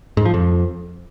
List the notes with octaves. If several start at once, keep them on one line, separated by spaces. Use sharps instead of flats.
G#2
F3
F2